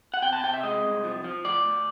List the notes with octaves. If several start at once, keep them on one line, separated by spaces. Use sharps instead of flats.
F#5
C3 G5
A5
C3 G5
E5
G#3 D#5
C2
F3
F3
D2 D5
D2